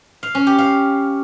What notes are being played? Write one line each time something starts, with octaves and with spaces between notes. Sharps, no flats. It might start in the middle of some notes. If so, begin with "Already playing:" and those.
F5
C#4
G4
F5